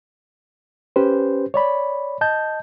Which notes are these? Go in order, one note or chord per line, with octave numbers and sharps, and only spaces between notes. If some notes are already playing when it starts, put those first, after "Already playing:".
C#4 G4 B4 C5
C#5 D5 B5
D#5 A5 G6